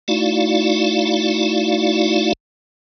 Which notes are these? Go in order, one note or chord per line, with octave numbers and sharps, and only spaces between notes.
A3 D#4 E4 F#4 D5 F5